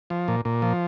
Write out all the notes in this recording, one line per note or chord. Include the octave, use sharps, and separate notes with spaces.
F3
A#2
A#2
F3